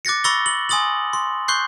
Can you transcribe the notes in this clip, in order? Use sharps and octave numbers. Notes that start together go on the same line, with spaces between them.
D6 F#6 A6 A#6 C#7
B5 C#6 E6 A6 A#6 G7
F#7
G#5 C6 D#6 A6 F#7
C6
C6 C#6 F#6 G6 C7